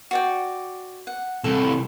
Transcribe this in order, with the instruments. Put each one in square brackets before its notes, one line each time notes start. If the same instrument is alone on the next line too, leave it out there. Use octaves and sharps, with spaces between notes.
[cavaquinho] F#4 D5 G5
F#5
[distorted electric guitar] C2 A2 [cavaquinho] A4